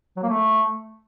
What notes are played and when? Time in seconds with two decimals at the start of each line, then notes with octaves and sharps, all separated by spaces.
0.17 F#3
0.23 A#3
0.29 A3